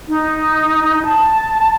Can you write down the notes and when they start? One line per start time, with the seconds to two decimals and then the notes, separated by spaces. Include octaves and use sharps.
0.09 D#4
1.04 A5